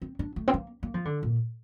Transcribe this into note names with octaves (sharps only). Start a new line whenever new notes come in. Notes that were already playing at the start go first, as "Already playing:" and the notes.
C4
D4
A3
C4
A#3
A#3
F3
D3
A#2